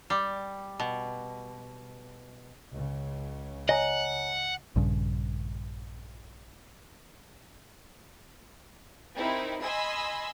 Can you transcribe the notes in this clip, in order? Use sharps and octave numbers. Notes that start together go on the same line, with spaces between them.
G3
B2
C#2 C#3
C#5 D#5 F#5 G#5 A#5
A#1 G2 C#3
C4 D#4 E4 G4 A#4
D#5 G#5 B5 C6 E6